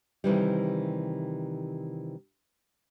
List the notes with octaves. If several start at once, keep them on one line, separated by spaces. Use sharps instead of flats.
C3 D#3 E3 G3